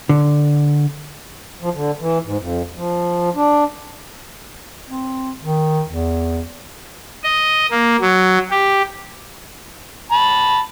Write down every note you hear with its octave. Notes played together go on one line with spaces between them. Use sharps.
D3
F3
D3
E3
G#2
F2
F3
D4
C4
D#3
E2
D#5
A#3
F#3
G4
A5 B5